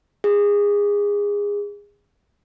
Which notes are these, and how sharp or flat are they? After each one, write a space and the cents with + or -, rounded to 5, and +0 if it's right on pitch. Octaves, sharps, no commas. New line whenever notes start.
G#4 -25